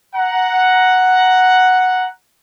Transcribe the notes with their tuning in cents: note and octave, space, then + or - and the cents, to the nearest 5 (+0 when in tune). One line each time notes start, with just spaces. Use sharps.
F#5 +0 A#5 +5